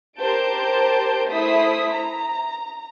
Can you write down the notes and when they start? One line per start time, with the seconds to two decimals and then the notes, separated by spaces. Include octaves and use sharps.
0.19 G4 A#4 C5 A5 G6 D7
1.29 A3 E4 C5 D#6 B6
1.92 A#5